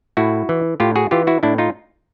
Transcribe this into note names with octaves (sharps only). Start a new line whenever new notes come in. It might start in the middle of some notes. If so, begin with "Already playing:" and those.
A2 E4 F#4
E3
A2 F4 G4
F#4 G#4
E3 F4 G4
E4 F#4
A2 D4 E4
D#4 F4